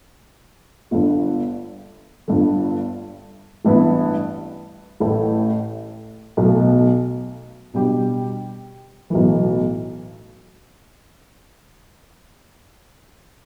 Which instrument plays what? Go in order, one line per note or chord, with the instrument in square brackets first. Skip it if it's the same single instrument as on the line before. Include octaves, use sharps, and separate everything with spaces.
[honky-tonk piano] G1 G2 D3
G1 G2 D3
A1 G2 E3 B3 E4
A1 A2 A3
B1 B2 A3
B2 G3 D4 G4
B1 A2 E3